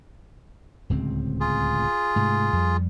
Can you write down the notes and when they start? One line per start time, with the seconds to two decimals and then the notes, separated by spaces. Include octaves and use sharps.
0.90 D1 C#2 C4
1.40 F4 G#4
2.16 G#2 C3 A3
2.53 F2 G3